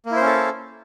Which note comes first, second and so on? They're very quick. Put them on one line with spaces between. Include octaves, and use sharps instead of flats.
A#3 E4 C5 C#4 A4